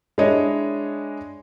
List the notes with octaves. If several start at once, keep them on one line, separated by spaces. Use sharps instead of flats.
G#3 D4 E4 C#5 D#5